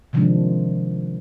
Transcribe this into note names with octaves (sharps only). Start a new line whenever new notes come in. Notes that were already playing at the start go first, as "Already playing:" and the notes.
C3 D#3 F3 G3 G#3 D4